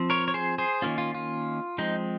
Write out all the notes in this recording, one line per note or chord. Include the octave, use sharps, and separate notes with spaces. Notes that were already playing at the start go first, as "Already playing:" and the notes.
Already playing: F3 C4
A#4 C#5
C#5
G#4 C5
G#4 C5
D#3 A#3 C#4 F4
F4
F4
F3 G#3 C4 D#4